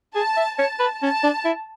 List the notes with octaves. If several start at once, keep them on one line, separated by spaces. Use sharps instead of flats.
G#4 A5
E5
C#5 A5
B4
C#4 A5
D4
E4